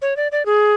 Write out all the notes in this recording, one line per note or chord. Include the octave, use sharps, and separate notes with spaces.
C#5
D5
D5
G#4